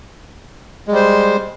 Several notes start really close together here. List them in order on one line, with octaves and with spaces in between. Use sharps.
G#3 G3 C5